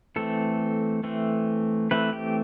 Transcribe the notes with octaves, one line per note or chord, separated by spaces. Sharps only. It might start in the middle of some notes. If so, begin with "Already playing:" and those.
E3 A3 C4 A4
E3 A3 C4
E3 A3 C4 B4
G4